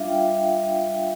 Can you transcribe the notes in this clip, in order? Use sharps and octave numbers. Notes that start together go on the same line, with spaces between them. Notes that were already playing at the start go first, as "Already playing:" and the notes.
Already playing: G3 D4 F4 E5 F5
G5